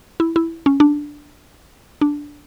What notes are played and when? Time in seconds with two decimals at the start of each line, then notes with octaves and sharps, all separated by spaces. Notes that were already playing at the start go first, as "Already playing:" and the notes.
0.20 E4
0.36 E4
0.66 C#4
0.80 D4
2.01 D4